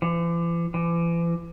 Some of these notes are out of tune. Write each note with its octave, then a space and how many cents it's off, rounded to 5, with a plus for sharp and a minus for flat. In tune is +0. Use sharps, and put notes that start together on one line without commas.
E3 +45
E3 +40